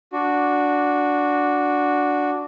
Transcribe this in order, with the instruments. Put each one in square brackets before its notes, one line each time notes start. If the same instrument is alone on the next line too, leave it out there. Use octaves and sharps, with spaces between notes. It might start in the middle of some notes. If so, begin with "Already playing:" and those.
[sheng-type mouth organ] D4 F#4